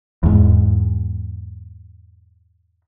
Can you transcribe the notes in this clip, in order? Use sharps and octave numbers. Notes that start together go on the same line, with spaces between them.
E2 G#2